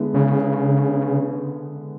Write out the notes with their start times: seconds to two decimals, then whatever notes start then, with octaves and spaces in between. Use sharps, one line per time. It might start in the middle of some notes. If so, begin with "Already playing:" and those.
Already playing: D3 G#3 B3 E4
0.14 C#3